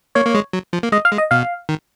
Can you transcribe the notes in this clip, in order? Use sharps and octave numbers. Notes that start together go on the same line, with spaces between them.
A#3 C#5
A#3
G#3
F#3
F3
A#3
G#3 D#5
F5
G#3
D#5
B2 F5
D#3